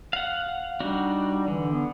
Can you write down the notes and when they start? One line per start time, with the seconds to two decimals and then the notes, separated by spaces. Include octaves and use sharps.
0.13 F5 F#5
0.80 G3 D4 D#4 F#4
1.48 D3 E3
1.71 B3